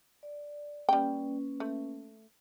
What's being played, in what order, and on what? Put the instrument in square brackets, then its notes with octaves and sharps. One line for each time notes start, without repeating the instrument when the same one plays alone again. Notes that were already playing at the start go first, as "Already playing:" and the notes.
[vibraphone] D5
[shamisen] G3 G5 [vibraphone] A#3 C#4 B4
[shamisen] A3